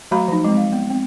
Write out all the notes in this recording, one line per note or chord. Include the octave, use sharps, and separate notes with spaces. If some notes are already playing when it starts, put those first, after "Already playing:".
F#3 A3 F#4 F5 A#5 B5
F3 D#4
G#3 C4
F5
B3
C4